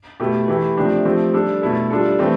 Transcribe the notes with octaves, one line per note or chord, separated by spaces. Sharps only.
B2 A3 E4 G4
E3 A3 E4 G4
C3 F3 A3 D4 G4
F3 A3 C4 G4
G3 D4 A4
B2 A3 E4 A4
G3 D4 F4 A4
E3 A3 C4 G4